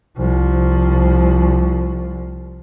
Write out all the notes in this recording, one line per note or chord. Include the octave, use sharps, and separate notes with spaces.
C2 F3